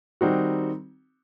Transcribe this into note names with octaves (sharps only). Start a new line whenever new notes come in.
D#3 G3 C4 D#4 F#4